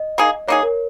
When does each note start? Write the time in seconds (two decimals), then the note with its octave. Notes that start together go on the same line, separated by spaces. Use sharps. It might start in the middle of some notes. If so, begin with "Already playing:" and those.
Already playing: D#5
0.18 A#3 D#4 G#4
0.48 A#3 D#4 G#4 C#5
0.63 A#4